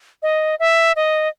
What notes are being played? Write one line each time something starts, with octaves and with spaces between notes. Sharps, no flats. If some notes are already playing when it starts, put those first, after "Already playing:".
D#5
E5
D#5